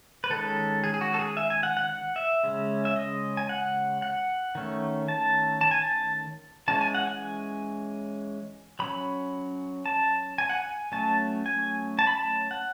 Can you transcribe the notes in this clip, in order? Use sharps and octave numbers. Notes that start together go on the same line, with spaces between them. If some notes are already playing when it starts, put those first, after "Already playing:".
B4
D#3 G#3 C#4 A4
G#4
G#4
F#4
A4
G#4
E5
G#5
F#5
F#5
F#5
E5
C#3 G#3 C#4
E5
D#5
G#5
F#5
F#5
D#3 A3 C#4
A5
A5
G#5
A5
E3 G#3 C#4 A5
G#5
F#5
G#5
F#3 C#4 B5
A5
G#5
F#5
G#5
F#3 A3 C#4 A5
G#5
A5
B5
A5
F#5